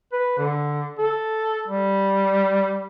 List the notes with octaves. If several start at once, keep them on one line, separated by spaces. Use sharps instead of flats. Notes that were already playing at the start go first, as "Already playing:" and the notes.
B4
D3
A4
G3